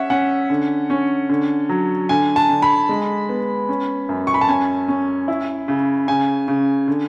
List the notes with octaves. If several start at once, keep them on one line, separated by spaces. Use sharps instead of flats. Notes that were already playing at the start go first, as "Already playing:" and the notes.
Already playing: C#4 E5 F#5
C#4 F#5
D3
C#4
D3
F#3
D3 G#5
A5
D3
B5
G#3
B3
C#4
F#2
C#6
B5
A5
C#4 G#5
C#4
E4
C#3
C#3 G#5
C#3
D3